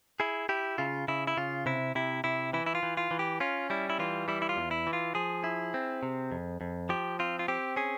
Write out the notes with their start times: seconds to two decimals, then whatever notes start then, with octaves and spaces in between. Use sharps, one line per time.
0.20 E4 G#4
0.49 E4 G4
0.78 C#3 F4
1.08 C#3 E4
1.27 E4
1.37 C#3 F4
1.66 C3 E4
1.95 C3 E4
2.24 C3 E4
2.53 E3 E4
2.66 E4
2.75 F4
2.83 E3
2.97 F4
3.11 E3
3.19 G4
3.40 C#4 F4
3.70 G3 E4
3.90 E4
3.99 E3 F4
4.28 G3 E4
4.42 E4
4.49 F4
4.57 E2
4.71 E4
4.87 E3
4.93 F4
5.15 F3 G#4
5.44 E4
5.74 C4
6.03 C3
6.31 F2
6.61 F2
6.89 F3 G4
7.19 C4 F4
7.39 F4
7.48 C4 G4
7.76 C#4 G#4